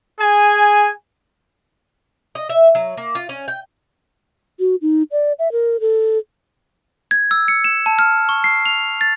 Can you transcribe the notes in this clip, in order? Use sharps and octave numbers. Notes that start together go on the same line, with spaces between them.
G#4 G#5
D#5
E5
F#3
A#3
F4
C#4
G5
F#4
D#4
D5
E5
A#4
A4
G#6
E6
C#7
E7
A5
F6
C#6
C7
F7
A6